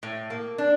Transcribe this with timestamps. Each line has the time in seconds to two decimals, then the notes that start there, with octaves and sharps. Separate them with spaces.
0.03 A2
0.30 A#3
0.58 D4